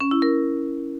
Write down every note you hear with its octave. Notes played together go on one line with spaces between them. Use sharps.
C#4
E4
A#4